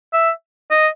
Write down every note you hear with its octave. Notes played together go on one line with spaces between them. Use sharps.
E5
D#5